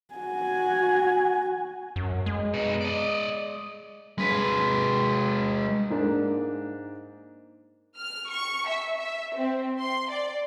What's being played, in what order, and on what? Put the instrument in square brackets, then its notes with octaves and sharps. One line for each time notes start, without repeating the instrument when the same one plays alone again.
[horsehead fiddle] F#4 G#5
[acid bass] F#2
G#3
[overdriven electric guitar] B2 D#4
D5 D#5
[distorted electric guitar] G#3 B4
[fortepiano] G#2 A#3 D4
[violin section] F6
C#6
E5
E5
C4
C6
D5